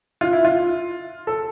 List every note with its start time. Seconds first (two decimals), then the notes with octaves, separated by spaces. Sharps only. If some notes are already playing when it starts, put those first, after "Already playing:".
0.21 F4
0.33 E4
0.45 F4
1.27 A4